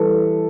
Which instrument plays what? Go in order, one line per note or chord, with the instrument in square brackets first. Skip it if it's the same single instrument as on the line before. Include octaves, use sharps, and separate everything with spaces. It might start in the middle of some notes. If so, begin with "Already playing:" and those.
Already playing: [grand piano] E3 G3 A4 B4